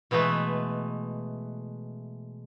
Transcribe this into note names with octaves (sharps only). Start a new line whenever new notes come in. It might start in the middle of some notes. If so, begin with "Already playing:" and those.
B2 E3 G#3 A3 B4